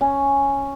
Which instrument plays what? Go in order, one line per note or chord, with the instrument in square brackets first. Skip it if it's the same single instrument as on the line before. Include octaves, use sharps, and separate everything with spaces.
[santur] C#4